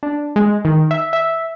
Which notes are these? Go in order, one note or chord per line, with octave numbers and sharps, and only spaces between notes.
D4
G#3
D#3
E5
E5